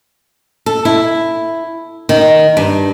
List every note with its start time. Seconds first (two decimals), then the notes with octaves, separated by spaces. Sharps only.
0.66 A4
0.85 E4
2.09 D#3
2.57 G2